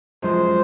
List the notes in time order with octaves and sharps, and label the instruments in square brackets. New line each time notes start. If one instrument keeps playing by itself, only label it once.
[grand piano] F#2 F3 G#3 [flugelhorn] C5